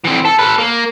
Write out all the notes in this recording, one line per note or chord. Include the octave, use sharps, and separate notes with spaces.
E3 C4
A4
A4 B4
A#3